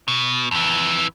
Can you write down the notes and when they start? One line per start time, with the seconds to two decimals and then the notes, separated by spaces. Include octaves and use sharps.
0.08 B2
0.51 F2 E3